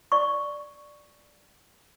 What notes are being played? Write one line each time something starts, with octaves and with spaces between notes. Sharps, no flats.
D5 C#6